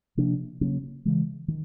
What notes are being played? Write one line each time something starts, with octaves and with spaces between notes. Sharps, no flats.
C3 F3 A#3 D4
C#3 F#3 A#3 C#4
C#3 E3 G#3
D#3